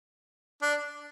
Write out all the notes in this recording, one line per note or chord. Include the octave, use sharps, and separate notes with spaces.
D4